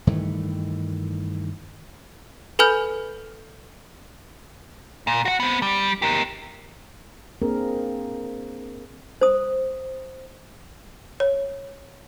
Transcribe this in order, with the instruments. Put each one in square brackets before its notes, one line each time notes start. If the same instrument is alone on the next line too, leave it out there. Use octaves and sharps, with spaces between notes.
[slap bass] G2 D#3 E3 A3
[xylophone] A4 B4 G#5 B5 F6 G6
[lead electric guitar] A#2
F#4 F#5
B3 C4
G3
G4 A#4
[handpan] A#3 C4 D4 G#4 A#4
[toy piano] C5 D#6
[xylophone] C#5